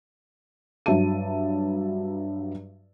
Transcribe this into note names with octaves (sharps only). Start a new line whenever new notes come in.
G2 F#3 E5 A5 D#7